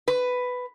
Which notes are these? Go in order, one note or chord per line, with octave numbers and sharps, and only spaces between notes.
B4